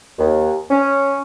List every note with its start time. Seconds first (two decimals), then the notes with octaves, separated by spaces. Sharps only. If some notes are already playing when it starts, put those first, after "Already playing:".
0.19 D#2
0.71 C#4